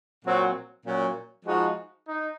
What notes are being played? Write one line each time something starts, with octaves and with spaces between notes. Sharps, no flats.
A#2 F#3 C4 F#4
A#2 F#3 C#4 F#4
F3 G#3 D#4 F#4
D#4